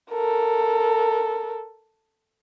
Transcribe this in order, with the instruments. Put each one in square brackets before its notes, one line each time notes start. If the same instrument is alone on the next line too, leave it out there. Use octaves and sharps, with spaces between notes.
[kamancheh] A4 A#4